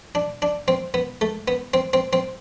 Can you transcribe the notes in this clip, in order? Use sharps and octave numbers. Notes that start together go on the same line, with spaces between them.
D4
D4
C4
B3
A3
B3
C4
C4
C4